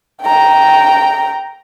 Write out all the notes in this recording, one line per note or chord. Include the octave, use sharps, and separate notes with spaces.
G5 A#5